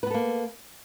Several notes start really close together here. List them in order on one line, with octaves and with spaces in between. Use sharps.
B4 B3 A4 A#3